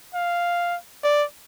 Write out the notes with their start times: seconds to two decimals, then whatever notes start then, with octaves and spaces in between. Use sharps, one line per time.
0.14 F5
1.03 D5